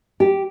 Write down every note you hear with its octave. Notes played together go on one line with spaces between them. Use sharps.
G4